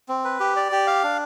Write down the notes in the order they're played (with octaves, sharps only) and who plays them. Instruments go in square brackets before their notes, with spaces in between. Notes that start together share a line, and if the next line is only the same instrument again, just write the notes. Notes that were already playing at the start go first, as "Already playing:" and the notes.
[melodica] C4
B4
G4
D5
G4
F5
D4